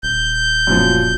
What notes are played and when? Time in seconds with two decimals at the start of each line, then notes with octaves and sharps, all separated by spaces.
0.03 D#1 G6
0.67 F#2 A#2 F3